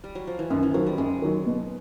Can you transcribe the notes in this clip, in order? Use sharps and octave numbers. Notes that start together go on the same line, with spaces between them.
G3
F#3
F3
E3
F#2 D#3
E3
D#3 F3 F#3
G3
F#2 G#3
D#3 F#3
B2